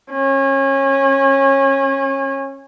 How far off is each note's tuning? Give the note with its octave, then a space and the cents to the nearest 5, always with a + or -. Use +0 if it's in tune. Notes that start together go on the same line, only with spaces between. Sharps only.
C#4 -25